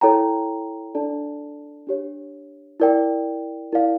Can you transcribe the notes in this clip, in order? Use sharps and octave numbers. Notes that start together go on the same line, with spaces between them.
E4 A4 C#5 G5 A#5
D4 A4 D5 A5
D4 G4 C#5
E4 A#4 D5 G5
E4 A#4 D5 F5